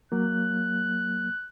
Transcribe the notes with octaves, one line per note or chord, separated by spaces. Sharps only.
F#3 A#3 F#6